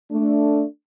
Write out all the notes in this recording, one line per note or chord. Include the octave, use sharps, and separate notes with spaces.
A3 D4